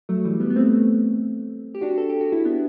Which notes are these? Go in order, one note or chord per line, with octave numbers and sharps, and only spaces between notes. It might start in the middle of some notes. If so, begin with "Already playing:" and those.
F#3 A3
E3 G3
G3 B3
B3
A3 C4
G4
D4 F#4
A4
G4
F#4
E4
B3 D4